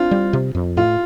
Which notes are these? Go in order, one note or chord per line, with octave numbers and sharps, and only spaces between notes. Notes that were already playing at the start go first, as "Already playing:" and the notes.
Already playing: C4 D4 F4
G3
C3
F2
A2 F4